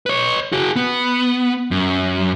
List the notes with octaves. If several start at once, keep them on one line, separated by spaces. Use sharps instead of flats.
B4 C#5
F#4 G#4
B3
F#2